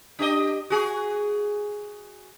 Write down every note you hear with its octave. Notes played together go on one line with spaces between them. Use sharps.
D4 G4 D#5
F#4 G#4